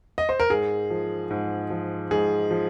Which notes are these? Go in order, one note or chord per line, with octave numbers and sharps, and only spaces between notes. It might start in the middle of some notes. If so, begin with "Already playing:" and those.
D#5
C5
A#4
G#2 G#4
F3
G#2
F3
G#2 G#4
F3